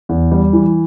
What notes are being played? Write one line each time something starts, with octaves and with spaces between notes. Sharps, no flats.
E2
G3
E3